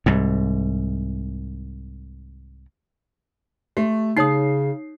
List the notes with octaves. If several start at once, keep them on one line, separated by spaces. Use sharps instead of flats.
C2 G#2
A3 G4
C#3 D#4 C#5 D#6 C7